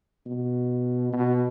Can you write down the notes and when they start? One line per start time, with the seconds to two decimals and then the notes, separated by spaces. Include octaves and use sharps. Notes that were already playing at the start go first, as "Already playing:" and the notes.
0.26 B2
1.13 B2